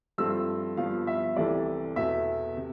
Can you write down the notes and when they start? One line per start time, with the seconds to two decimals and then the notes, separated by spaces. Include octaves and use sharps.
0.18 G2 F3 A3 C4 E6
0.77 G2 F3 B3 F5
1.07 E5
1.37 C2 C3 E3 A3 D5
1.96 E2 B2 A3 E5
2.57 C3